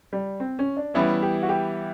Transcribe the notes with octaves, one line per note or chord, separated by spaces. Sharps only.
G3
C4
C#4
D4
E3 G3 B3 C#4 E4
G4
F#4
G4